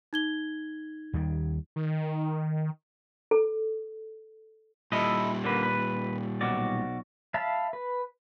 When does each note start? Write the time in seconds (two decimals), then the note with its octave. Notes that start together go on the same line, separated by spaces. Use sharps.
0.13 D#4 G#6 G7
1.13 D#2 D#3 G3
1.76 D#3
3.31 A4
4.92 A#2 G3 E4 A4 D#5
5.44 D3 A#3 B4
5.63 B4
6.41 B1 F#4 D5
7.34 E5 F5 A5 B5
7.73 B4